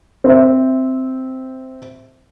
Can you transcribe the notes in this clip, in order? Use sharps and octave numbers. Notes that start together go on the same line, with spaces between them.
C4 C5 E5